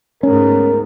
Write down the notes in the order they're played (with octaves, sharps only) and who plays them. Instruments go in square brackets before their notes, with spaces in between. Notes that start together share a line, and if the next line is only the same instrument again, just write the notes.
[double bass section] D2 G#2 B3 [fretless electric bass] C#4 [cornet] A#4